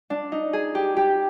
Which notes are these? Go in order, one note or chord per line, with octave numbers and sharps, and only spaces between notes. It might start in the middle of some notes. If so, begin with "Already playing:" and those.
D4
D#4
G#4
G4
G4